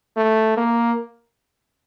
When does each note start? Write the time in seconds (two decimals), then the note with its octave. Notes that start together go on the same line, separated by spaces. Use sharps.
0.16 A3
0.57 A#3